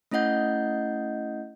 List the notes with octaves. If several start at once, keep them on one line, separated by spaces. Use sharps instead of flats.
A3 C#4 E4 D#5 F#5 G6